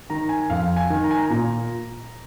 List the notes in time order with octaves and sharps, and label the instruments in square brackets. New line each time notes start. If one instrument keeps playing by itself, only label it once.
[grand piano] D#3 A#5
G#5
F2 F5
G#5
D#3
A#5
G#5
A#5
A#2